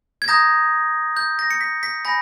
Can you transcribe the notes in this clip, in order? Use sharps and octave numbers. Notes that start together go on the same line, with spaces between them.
G#6
A#5 D#6 G6 A#6
G6
A#6
C#7
B6
B6
G#5 B5 G6 A#6